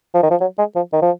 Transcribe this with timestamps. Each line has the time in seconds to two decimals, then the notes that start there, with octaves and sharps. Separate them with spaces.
0.14 F3
0.23 D#3
0.31 F3
0.41 F#3
0.58 G#3
0.76 F3
0.93 D#3
1.02 F3